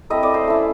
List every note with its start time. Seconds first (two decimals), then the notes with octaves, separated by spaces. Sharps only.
0.10 A3 C4 E4 D#5
0.23 D5
0.34 C5
0.47 A3 C#4 E4